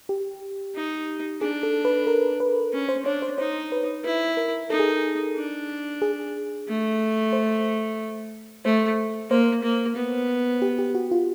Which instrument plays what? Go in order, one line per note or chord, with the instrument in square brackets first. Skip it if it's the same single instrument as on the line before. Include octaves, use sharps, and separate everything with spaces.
[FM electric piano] G4
[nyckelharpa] D#4
[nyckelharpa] D4 [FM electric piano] G#4
[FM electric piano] A4
B4
A#4
B4
[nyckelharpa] C#4
[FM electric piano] C5
[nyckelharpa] D4 [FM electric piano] C#5
[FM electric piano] C5
[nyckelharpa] D#4 [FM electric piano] C5
[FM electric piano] B4
[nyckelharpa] E4 [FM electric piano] B4
[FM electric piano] A#4
[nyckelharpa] D#4 [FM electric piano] A4
[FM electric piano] G#4
A4
[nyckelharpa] D4
[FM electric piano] G#4
[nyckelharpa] A3
[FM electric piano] C5
[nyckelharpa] A3 [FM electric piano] C5
[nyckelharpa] A#3 [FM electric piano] C5
[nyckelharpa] A#3
B3
[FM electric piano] G4
G4
F#4
F4